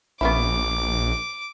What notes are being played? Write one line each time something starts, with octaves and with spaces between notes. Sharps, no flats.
A#1 B3 C#4 E4 D6